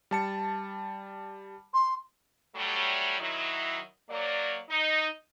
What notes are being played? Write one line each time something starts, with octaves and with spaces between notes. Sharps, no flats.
G3 A5 C#7
C6
F#3 G3 A3
D#3 F#3 E4
F#3 A#3 D5
D#4